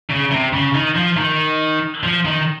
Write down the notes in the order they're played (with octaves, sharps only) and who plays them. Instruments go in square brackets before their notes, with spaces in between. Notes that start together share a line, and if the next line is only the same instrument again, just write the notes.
[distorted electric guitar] C#3
C3
C#3
D#3
F3
D#3
F3
D#3